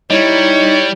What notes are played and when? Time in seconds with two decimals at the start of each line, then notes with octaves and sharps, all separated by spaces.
0.10 G3 D#4 E4 C#5